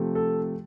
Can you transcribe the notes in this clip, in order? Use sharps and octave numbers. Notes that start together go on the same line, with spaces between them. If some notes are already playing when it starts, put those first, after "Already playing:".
Already playing: C3 F3 A3
A4